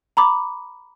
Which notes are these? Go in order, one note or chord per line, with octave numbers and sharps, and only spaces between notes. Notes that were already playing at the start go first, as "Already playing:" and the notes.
A#5 B5 D6